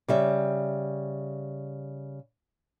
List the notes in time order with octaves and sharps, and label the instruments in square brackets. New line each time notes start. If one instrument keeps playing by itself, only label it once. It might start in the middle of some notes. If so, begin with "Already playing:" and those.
[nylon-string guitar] C#3 G3 E5